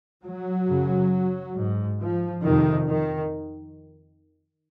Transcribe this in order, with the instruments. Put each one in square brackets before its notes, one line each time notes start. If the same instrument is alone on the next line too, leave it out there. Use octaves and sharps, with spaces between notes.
[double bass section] F#3
F#2 C#3
G#2
F3
F2 C3 D#3
D#3